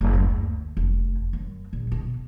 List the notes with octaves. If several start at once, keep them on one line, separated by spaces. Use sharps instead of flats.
F#1
D2
F1
F#2
A#1
B2